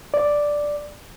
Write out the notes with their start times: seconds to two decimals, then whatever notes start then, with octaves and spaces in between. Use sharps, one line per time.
0.14 D5